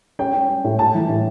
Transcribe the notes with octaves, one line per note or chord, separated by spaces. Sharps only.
C#4 G5
C#4
C#4
A2
A2 A5
E3
A2